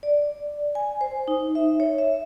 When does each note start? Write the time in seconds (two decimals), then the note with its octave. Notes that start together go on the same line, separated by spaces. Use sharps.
0.03 D5
0.75 G#5
1.01 C5
1.28 D#4
1.55 E5
1.80 C#5
1.98 E5